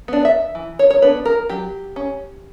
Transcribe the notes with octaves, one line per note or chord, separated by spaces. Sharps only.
B3 D4
E5
E3
C#5
C#5
B3 D4 B4
A#4
F#3 G4
C#4